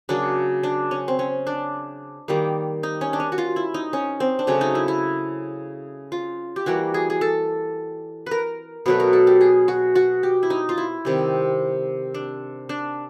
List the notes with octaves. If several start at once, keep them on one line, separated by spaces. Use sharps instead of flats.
C#3 F#3 A#3 D4
D4
C#4
C4
C#4
D4
D#3 G3 A#3
D#4
C#4
D4
C#4
F#4
F4
E4
D#4
C#4
C4
D4
C#3 F#3 A3 C#4
D#4
E4
E4
F4
G4
E3 G3 A#3 F#4
G#4
G#4
A4
A#4 B4
B2 F#3 A3 B4
A#4
A4
G4
G#4
F#4
F#4
G4
E4
D#4
F4
E4
C3 D#3 G3
D4
D4